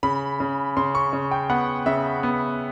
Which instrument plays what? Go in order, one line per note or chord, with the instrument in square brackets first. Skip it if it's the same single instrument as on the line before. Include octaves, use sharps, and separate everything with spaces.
[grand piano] C#3 B5
C#3
C#3 C6
C#6
C#3
G5
B3 F#5
C#3 E5
B3